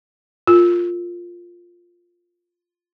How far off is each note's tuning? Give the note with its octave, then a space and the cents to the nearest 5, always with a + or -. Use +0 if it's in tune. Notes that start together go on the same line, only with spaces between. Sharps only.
F4 +0 A#4 -30